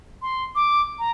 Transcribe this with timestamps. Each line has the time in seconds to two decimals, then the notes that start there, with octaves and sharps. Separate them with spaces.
0.22 C6
0.55 D6
0.99 A#5